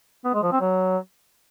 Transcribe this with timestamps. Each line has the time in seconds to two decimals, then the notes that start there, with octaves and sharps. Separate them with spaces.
0.25 B3
0.34 G#3
0.43 F3
0.52 C4
0.61 F#3